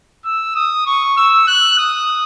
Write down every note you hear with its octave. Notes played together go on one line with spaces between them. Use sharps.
E6
D#6
C#6
E6
F#6
D#6